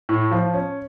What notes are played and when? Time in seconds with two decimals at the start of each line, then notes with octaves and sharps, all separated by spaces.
0.09 A2
0.31 F3
0.54 C#4